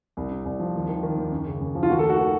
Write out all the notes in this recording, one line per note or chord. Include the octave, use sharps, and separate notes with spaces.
C2
C3
C2
F3
D#2
D#3
D#3
D#2
F#2
C#3
F#2
F3
F4
D#2 F#4
A3 A4
D#3 F#4
D#3 F#4